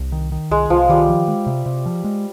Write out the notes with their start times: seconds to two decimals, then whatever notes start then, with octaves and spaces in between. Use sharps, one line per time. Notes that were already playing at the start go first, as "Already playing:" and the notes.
Already playing: C2
0.12 D#3
0.32 D#3
0.51 C2 G#3
0.70 C2 F3
0.89 D#3 G3
1.09 F3
1.28 G#3
1.47 C3
1.66 C3
1.86 F3
2.04 G#3